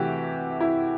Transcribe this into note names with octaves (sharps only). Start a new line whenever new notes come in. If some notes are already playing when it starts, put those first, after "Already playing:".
Already playing: C3 E3 A3 F#4 G4
E4